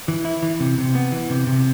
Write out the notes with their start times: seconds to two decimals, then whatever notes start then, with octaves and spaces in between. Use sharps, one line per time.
0.08 E3
0.25 E4
0.43 E3
0.60 C3
0.78 C3
0.95 B3
1.12 E3
1.30 C3
1.47 C3